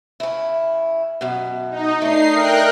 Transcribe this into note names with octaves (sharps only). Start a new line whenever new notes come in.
C#3 E4
F#2 B2
D#4
A3 D4 D#4 C7
A#4 G5 F#6